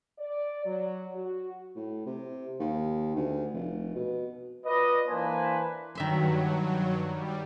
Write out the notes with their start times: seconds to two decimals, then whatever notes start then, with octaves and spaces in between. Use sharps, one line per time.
0.19 D5
0.65 F#3
1.15 F#4
1.76 A2
2.06 C3
2.60 D#2
3.16 D2
3.54 F1
3.95 B2
4.66 F4 B4 D5 D#5
5.08 E3 A#3 D4 B4 C5 G#5
5.95 G2 D#3 F#3 E5 C6
7.10 G3